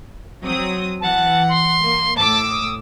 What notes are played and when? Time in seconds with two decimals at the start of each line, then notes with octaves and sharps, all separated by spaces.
0.44 F#3 C4 D#6
1.00 E3 F#5 A5
1.49 C6
1.81 A#3
2.17 A2 A5 D6 E6
2.51 D#6